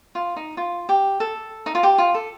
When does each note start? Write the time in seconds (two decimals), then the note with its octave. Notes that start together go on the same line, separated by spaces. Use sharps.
0.15 F4
0.36 D#4
0.57 F4
0.89 G4
1.20 A4
1.66 D#4
1.75 F4
1.83 G4
1.98 F4
2.14 A4